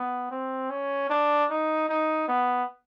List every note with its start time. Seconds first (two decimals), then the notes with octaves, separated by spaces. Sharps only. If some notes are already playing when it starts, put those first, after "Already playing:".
Already playing: B3
0.31 C4
0.70 C#4
1.10 D4
1.50 D#4
1.89 D#4
2.28 B3